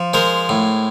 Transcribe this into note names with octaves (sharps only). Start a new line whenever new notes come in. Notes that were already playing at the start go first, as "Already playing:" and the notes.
Already playing: F3
G#3 A#4 C5
A2